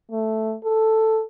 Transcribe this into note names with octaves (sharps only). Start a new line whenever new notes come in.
A3
A4